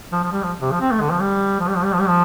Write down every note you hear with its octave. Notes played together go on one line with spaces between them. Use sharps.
F3
F3
G3
F3
C3
F3
C4
A3
D3
F3
G3
F3
G3
F3
G3
F3
G3
F3